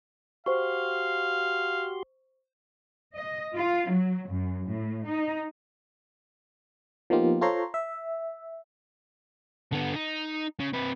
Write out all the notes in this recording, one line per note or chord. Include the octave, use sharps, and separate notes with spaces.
F#4 G4 C5 F5 C6 C#6
D#5
F4
F#3
F#2
A2
D#4
F3 A#3 B3 D#4 F4 G4
F4 A4 C5 C#5 A#5 C6
E5
D3 B3
D#4
C#3
C3 B4